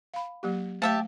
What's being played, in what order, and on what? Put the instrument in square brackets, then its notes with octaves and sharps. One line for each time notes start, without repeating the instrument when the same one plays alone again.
[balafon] F5 B5
F#3 A#3 G4
[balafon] A3 C5 F5 [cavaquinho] G4 E5 A5